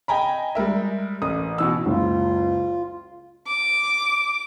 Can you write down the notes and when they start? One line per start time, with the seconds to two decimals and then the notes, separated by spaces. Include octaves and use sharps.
0.08 D#5 G5 G#5 A#5 B5
0.55 G3 G#3 A#4 E5
1.22 A1 A#4 D#6
1.58 B2 E3 E6
1.86 F#1 C#2 F4
3.47 D6